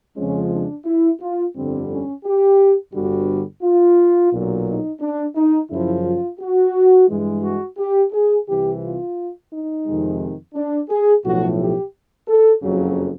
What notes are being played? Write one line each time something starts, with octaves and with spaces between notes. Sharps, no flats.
F2 C#3 F3 G#3 C#4
D4
E4
F4
G1 F2 D3 G3 C4
C#4
G4
G1 G2 D3 G3 F#4
F4
B1 A#2 F#3
D#4
D4
D#4
F#2 C#3 F3 E4
F4
F#4
G2 E3 G#3
F#4
G4
G#4
C2 C3 E3 G4
F4
D#4
F2 C3 D#3 G#3
D4
G#4
B1 A2 F3 A3 F#4
G4
A4
F#1 F2 C#3 F#3